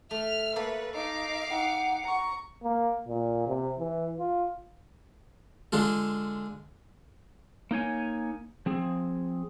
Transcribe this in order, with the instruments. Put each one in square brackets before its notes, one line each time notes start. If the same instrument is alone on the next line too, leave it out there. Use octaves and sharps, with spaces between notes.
[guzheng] A3 [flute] E5 [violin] F6
[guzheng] A#3 A4 C#5 [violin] B4
[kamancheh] D#4 [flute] D#5 [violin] F5 D6
[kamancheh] D#4 G5 [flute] F#5
[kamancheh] A#5 C#6
[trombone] A#3
A#2
C3
E3
F4
[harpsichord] D3 G#3 F4 A4
[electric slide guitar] A#3 D#4 C#5 G#5
F3 C4 G#4